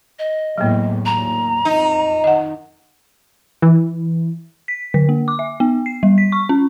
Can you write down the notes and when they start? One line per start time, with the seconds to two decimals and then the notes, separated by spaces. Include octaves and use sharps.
0.19 D#5
0.58 E2 A2 F#3 A#3
1.06 D#2 A#2 A#5
1.65 F2 D#4
2.24 D#3 D#5 F#5
3.62 E3
4.68 B6
4.94 D3
5.09 A#3
5.28 D6
5.39 E5
5.60 B3
5.86 C7
6.03 G3
6.18 B6
6.32 C#6
6.49 C#4